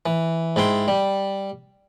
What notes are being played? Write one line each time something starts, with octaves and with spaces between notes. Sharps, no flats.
E3
G#2 E4 G5 C6
G3